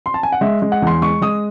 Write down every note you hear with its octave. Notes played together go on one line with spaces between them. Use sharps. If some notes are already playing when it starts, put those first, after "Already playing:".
C6
A5
G#5
F#5
G#3 E5
G#3
F#5
E2
C6
G#3 C#6
G#3 D#6